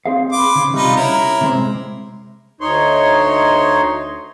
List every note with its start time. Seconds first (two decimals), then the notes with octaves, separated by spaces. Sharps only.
0.06 C4 G#4 F5
0.32 B4 C6 D6
0.56 C#3
0.74 C3 G3 D#4 F4 B4
0.97 C#4 E4 A#4
1.41 C3 G#3 C4
2.61 D2 D#4 C#5 C6